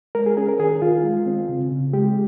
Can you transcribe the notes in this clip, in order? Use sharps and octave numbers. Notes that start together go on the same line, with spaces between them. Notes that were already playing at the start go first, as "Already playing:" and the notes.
G#3 A#4
G#4
C#4 G#4
A#4
D#3 G#4
D#3 F4
G#3
C4
C#3
C#3
G#3 G4